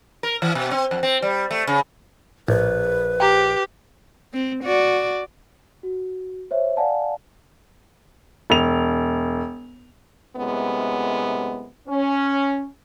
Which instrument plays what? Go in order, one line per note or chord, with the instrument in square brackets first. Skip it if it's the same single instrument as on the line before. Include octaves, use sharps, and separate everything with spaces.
[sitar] A#4
E3
B2
C4
F2
C4
G3
A3
C#3
[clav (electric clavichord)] A#1 [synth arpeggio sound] A2 [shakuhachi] B4
[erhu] G4 [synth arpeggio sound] G5 A#5
[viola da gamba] C4
F#4 D5
[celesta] F#4
C5 C#5 E5
D5 F5 F#5 G#5 A5
[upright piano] E1 F7
[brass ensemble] F#2 A2 C3 G#3 B3
C#4